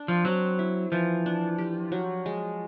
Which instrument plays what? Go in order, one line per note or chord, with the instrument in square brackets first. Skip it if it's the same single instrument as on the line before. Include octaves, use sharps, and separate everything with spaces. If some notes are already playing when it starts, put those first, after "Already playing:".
Already playing: [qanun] D4
[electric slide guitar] F3
[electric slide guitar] F#3 [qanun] C4
[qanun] E4
[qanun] E3 [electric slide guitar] F3
[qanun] D4
G4
F#3
G#3